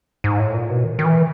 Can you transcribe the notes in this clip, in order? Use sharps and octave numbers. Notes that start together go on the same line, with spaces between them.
G#2
A2
A#2
B2
D#3
D#3
E3